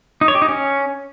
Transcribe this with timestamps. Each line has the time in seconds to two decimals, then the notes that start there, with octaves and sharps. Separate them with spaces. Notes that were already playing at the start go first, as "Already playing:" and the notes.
0.21 D#4
0.28 C#5
0.35 G4
0.42 D#4
0.49 C#4